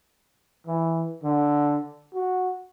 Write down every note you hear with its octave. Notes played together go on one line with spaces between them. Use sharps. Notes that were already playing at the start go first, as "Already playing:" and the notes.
E3
D3
F#4